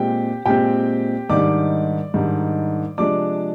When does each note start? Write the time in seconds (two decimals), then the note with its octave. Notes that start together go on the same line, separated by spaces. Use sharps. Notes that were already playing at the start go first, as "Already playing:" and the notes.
Already playing: A#2 G#3 C4 G4 G5
0.46 A#2 G#3 C4 G4 G5
1.30 G#2 D#3 G3 D4 D5 D6
2.14 G#2 D#3 G3 D4
2.98 C3 F3 G#3 D4 D5 D6